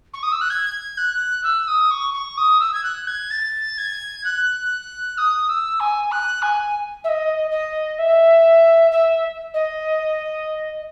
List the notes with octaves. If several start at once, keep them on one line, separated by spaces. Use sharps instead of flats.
C#6
D#6
E6
F#6
G#6
F#6
E6
D#6
C#6
C#6
D#6
E6
G#6
F#6
G#6
A6
G#6
F#6
D#6
E6
G#5
F#6
G#5
E5
D#5
D#5
E5
E5
D#5